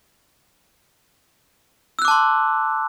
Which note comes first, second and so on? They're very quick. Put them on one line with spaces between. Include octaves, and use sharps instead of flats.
E6 F#6 D6 A5 C6